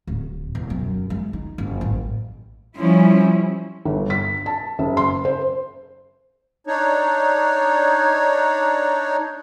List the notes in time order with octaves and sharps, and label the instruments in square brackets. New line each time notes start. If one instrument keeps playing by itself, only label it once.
[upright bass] D1
E1
F#2
G#3
D#4
F#1
A1
[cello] F3 [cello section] G3 C#4 E4
[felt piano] G1
B6
A5
F#1
C6
C5
[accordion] D4 D#4 C#5